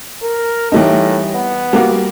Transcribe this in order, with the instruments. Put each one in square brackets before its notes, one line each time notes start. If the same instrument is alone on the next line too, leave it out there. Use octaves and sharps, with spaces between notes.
[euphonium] A#4
[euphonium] A2 [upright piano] E3 G3 D#4
[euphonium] B3
[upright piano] G3 A#3 F#4